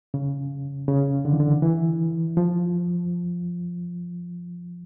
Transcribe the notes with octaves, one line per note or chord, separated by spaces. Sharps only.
C#3
C#3
D3
E3
D3
E3
F3